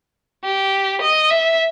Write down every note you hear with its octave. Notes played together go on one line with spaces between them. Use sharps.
G4
D#5
E5